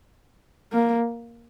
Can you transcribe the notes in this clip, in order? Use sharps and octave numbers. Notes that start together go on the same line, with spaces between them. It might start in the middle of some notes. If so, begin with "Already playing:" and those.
A#3